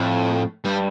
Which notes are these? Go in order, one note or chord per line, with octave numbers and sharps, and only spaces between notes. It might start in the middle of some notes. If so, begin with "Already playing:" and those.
Already playing: F2 A2
G2 G3